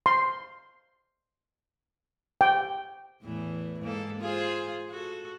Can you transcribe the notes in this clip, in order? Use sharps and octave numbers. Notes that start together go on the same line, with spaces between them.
C6
G5
E2 A2 E3
G#2 A#3 A4
F4 G#4 C5
F#4 A4